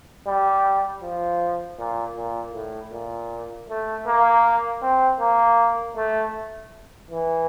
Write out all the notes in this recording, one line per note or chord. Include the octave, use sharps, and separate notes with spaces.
G3
F3
A#2
A#2
A2
A#2
A3
A#3
C4
A#3
A3
E3